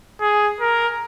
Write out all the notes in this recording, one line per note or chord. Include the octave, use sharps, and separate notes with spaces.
G#4
A#4